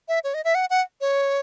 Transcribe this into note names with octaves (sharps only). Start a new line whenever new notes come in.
E5
C#5
D#5
E5
F#5
F#5
C#5